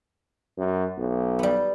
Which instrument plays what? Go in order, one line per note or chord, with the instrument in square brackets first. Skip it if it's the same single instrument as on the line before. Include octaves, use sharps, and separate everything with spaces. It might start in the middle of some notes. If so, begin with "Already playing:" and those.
[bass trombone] F#2
B1
[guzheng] G3 B3